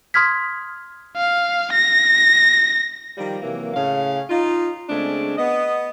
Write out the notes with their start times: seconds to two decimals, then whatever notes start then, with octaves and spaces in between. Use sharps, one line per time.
0.14 C6 D#6 F6 G#6 B6
1.17 F5
1.73 A#6
3.18 D#3 F3 G3
3.42 C3 E3 F#3 A#3
3.74 A2 C#3 C#4 F5
4.30 D#4 F4
4.89 C#3 G#3 A3 C4 D4
5.38 B3 D#5